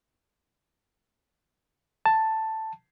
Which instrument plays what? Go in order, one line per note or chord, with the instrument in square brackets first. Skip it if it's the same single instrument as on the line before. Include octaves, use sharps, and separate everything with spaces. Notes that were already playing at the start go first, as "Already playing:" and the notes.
[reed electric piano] A5